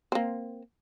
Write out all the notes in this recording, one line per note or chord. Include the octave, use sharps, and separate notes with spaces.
A#3 C4